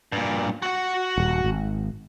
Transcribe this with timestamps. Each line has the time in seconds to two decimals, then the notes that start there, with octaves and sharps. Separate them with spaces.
0.12 G2 A#2
0.62 F#4 F#5
1.18 D#1
1.44 G#1